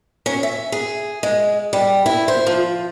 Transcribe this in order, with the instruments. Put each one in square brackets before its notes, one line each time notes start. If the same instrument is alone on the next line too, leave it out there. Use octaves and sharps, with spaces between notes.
[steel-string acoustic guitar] C#4
E5
G#4
G#3
G3
E4
C5
F3